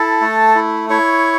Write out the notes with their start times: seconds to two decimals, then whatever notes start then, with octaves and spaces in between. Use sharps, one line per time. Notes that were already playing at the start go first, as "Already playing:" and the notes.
Already playing: E4 A4 A5
0.21 A3
0.55 E4
0.90 E4 C#5 C#6